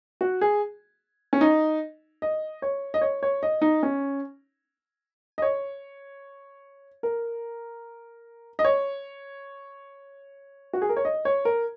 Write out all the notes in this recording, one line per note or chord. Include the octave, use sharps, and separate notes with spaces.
F#4
G#4
C#4
D#4
D#5
C#5
D#5
C#5
C#5
D#5
D#4
C#4
D#5
C#5
A#4
D#5
C#5
F#4
G#4
A#4
C#5
D#5
C#5
A#4